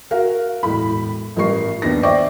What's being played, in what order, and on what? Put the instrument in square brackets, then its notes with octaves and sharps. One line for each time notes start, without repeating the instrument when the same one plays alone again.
[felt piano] F#4 A#4 F5
E1 A2 B5
A1 F3 G3 A#4 C#6 C7
D#2 B3 D4 B4 A#6
C5 D5 E5 G5 C#6 D6